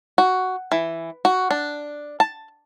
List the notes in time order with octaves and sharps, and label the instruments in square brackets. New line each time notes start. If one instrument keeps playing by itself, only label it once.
[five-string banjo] F#4
E3
F#4
D4
A5